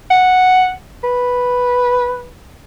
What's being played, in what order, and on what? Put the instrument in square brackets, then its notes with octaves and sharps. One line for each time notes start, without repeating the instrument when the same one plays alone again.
[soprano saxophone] F#5
B4